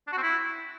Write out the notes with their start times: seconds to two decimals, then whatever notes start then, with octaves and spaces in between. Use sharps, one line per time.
0.07 D4
0.13 F#4
0.18 C4
0.23 E4